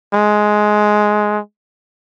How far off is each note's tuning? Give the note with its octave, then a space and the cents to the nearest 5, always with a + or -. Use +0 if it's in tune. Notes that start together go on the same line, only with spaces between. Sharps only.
G#3 +10